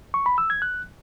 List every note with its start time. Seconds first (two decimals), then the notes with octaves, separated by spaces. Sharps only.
0.14 C#6
0.26 B5
0.38 E6
0.50 G#6
0.62 F#6